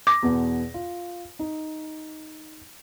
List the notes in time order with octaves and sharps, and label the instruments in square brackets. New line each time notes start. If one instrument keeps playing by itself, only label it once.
[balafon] D6 [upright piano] A#6
[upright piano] E2 B2 B3
F4
D#4